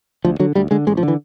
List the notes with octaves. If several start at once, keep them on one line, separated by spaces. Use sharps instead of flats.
D2 F3
D3 F#3
D2 G3
D3 G#3
A1 G#3
F3
D3
E3